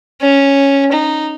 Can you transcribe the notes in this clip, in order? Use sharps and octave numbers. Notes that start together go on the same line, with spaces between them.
C#4
D#4